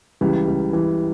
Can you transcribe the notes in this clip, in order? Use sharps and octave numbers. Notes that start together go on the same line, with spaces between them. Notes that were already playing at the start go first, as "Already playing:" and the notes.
C#2 E3 G3
C#2
E3